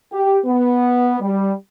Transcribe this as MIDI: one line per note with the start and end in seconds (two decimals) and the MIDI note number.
0.13 0.39 67
0.45 1.16 59
1.21 1.53 55